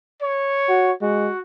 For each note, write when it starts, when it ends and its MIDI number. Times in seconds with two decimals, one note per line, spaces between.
0.21 0.92 73
0.69 0.92 66
1.02 1.30 56
1.02 1.40 66